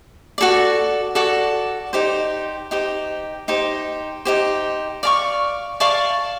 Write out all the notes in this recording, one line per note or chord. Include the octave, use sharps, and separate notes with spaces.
F#4 A4 D5
F#4 A4 D5
D#4 G4 C5
D#4 G4 C5
D#4 G4 C5
D#4 G4 C5
D5 F5 A5 C#6
D5 F5 A5 C#6